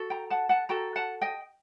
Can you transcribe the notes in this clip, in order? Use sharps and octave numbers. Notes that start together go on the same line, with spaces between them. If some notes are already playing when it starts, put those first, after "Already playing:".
Already playing: F#4 A4
G5 A#5
F#5 A5
F#5 A5
F#4 A4 G5 A#5
F#5 A5
D#5 G5